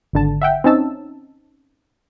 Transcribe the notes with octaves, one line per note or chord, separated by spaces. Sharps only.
G#1 D3 A5
E5 F#5 G5
C4 C#4 D#4 A5 E6